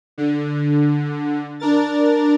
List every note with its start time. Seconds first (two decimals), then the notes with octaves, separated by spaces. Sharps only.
0.18 D3
1.60 D4 A#4 A6